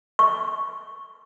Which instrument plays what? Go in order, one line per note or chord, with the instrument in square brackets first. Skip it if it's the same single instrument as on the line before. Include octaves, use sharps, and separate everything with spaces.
[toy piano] C#6